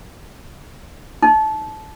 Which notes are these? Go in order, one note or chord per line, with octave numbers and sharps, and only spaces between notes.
D#4